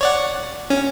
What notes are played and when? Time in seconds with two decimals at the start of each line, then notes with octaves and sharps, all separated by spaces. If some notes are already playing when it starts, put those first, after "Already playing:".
0.01 C#5 D5 F#5
0.70 C#4